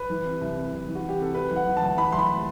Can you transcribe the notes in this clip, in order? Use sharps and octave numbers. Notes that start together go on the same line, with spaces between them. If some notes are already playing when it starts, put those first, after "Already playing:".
Already playing: B4
E3
C3
C2
C3
C2
E3
F#4
E3
G4
C3 A4
C3 B4
E3
F#5
E3
A5
D2
E3 B5
D2 C6
B5